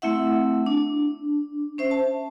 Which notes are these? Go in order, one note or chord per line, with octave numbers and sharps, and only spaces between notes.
A3 C4 E4 E5 F#5
D4
C#4 C5 E5
A5